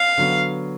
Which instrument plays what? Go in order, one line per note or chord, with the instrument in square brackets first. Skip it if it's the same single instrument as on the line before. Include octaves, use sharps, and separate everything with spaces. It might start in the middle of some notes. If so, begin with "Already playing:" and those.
Already playing: [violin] F5
[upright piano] D3 F#3 B3